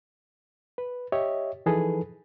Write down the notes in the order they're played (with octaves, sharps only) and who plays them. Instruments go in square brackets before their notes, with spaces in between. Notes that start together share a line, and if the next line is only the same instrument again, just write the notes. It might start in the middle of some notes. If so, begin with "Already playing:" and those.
[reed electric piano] B4
G4 C#5 D#5 E5
E3 F3 D#4 G#4 A4 B4